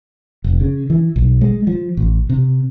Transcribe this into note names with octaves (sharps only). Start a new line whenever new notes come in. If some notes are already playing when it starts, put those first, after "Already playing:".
F1
C#3
E3
B1
G#3
F3
A1
C3